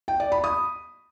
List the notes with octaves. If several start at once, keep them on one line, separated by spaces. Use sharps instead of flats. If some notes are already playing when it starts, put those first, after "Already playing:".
G5
D5
B5
D#6